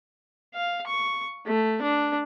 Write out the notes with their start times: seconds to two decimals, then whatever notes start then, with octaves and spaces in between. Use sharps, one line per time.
0.54 F5
0.87 C#6
1.46 A3
1.82 D4